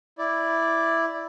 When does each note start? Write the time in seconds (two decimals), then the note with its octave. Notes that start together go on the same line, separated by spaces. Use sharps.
0.18 E4 D5